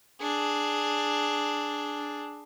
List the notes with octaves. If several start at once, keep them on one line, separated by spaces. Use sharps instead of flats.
D4 G#4